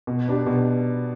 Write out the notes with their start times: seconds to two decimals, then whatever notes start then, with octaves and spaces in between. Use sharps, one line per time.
0.07 B2
0.28 B3 D4 G4
0.47 B2